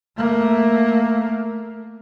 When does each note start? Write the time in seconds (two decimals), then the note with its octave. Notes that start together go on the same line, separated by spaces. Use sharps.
0.17 A3 A#3